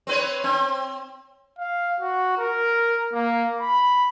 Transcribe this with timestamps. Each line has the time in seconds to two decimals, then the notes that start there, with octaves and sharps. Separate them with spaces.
0.07 C4 B4 C#5
0.44 C4
1.59 F5
2.00 F#4
2.38 A#4
3.13 A#3
3.61 B5